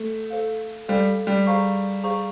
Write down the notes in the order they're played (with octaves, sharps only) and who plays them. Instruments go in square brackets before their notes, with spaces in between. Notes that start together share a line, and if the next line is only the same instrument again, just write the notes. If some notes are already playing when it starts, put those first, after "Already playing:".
Already playing: [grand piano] A3
[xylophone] A4 C5 F5
[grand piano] G3 [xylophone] A4 C5 F5
[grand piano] G3
[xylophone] G#4 C5 F5 A#5 C#6
G#4 C5 F5 A#5 C#6